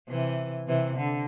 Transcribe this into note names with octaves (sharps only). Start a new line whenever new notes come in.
C3 E3
C3 E3
D3